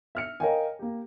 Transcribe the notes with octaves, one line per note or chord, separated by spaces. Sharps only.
E5 F6 C#7
A#4 C#5 D#5 F5 G5 G#5
A#3 G4